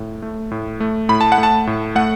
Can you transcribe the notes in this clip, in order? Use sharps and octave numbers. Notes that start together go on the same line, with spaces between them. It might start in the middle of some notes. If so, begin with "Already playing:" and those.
Already playing: A2
A3
A2
A3
A2 B5
A5
F#5
A3
A5
A2
A3 F#5